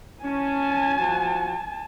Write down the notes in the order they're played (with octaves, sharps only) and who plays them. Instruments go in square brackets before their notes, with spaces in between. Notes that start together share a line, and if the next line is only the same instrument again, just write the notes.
[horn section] C#4 [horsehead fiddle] G#5 A5
[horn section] F3 F#4